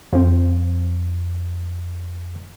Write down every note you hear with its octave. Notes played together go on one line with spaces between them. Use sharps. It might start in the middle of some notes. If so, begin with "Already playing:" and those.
F2 F3 C4